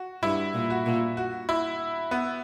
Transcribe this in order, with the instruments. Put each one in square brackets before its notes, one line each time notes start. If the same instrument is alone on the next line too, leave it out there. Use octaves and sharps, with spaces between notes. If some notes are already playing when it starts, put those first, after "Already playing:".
Already playing: [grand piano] F#4
[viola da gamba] G2 [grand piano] E4
[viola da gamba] A#2
[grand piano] F#4
[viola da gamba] A#2
[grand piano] F#4
E4
B3